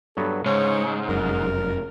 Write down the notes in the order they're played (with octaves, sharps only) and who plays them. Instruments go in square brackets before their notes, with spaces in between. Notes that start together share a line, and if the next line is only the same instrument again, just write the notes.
[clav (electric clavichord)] G2 F#3 B3 [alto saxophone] A4
[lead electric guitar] G#2 [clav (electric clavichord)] C#3 [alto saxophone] C#5
[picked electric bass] F1 F#2 [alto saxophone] A#4